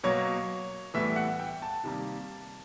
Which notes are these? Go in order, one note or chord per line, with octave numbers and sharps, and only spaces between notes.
B2 F#3 A#3 C#5
A2 E3 G3 B3 E5
F#5
G5
A5
C3 D#3 G3 A#3